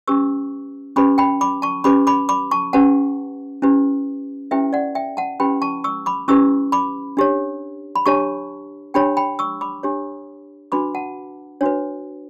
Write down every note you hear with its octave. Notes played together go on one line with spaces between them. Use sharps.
C#4 G4 B4 C#6 E6
C#4 G4 B4 B5 D6
G5 B5
B5 D6
A5 C#6
C#4 G4 B4 B5 D6
B5 D6
B5 D6
A5 C#6
C#4 G4 B4 F#5 A5
C#4 E4 G4 B4
C#4 E4 G4 B4 E5 G5
D5 F#5
E5 G5
F#5 A5
C#4 E4 G4 B4 G5 B5
A5 C#6
C#6 E6
B5 D6
C#4 E4 G4 B4 C#6 E6
B5 D6
D4 G4 C#5
B5
D4 G4 C#5 A5 C#6
D4 G4 C#5 G5 B5
G5 B5
C#6 E6
B5 D6
D4 G4 C#5
D4 F#4 B4 B5 D6
F#5 A5
D4 F#4 B4 C#5